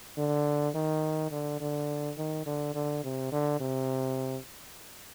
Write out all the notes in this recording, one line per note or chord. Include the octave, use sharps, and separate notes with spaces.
D3
D#3
D3
D3
D#3
D3
D3
C3
D3
C3